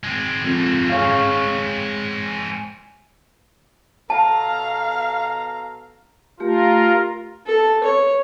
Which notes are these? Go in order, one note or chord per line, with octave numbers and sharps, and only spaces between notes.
G#3 C4
F2
G#4 C#5 F5
B2 A4 F5 A5 A#5
A3 F4 G4 A#4
A4
C#5